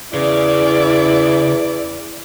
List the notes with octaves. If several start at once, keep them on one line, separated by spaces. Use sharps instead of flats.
E2 C#3 E4 D5